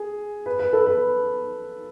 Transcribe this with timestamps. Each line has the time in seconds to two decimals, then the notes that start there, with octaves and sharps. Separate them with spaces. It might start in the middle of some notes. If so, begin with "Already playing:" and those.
Already playing: G#4
0.46 B4
0.59 B4
0.73 A4
0.87 B4